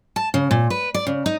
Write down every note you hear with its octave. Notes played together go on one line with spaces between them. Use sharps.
A5
C#3
A#2
B4
D5
C#3
D#4